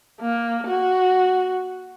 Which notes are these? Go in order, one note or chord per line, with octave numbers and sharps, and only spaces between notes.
A#3
F#4